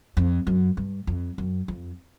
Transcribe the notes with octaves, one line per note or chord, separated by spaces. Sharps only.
F2
F#2
G2
F2
F#2
F2